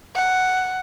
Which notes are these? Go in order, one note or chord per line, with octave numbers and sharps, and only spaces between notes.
F#5